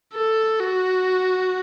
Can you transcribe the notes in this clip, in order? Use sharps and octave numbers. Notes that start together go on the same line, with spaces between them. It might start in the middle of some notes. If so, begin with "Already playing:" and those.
A4
F#4